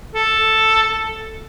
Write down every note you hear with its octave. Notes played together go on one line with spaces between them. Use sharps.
A4